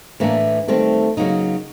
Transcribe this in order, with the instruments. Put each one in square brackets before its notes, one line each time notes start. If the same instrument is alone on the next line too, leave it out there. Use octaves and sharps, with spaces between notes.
[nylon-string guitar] A2 E3 A3 D4 [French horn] A#3
[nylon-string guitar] D#3 G3 C4 [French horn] A3
[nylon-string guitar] C#3 F#3 A#3 D#4